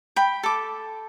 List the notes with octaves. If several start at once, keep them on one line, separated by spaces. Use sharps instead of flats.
G5 B5
A4 D6